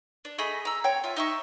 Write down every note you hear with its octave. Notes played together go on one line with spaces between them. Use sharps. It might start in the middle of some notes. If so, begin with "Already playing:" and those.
D4
A3 G#4 D#5 B5
A#5 E6
C4 C#5 G5
F4 E5
D#4 E5 C#6